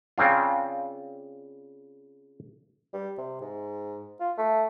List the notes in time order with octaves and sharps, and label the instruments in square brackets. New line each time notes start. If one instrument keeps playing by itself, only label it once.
[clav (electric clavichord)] C#3 C4 D4 F4
[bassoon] G3
C3
G#2
F4
A3